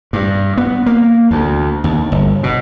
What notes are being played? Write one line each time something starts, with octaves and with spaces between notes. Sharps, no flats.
G2
B3
A#3
D2
D#2
G1
B2